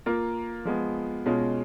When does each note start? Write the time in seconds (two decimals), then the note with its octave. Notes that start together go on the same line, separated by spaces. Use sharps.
0.06 A#3 F4 A#4
0.65 F3 G#3 B3
1.26 B2 G#3 C#4 F4